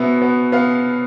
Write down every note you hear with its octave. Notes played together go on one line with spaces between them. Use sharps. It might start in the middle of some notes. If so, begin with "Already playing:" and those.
Already playing: B2 B3 E5
B3
B3 F5